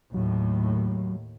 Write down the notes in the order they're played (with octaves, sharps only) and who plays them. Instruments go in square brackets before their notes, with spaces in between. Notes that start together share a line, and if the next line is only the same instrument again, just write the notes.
[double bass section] D#2 A2 [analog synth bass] F#3